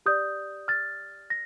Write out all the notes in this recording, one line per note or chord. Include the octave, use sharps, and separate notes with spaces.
G4 D5 D#6 G6
F6 A6
A#6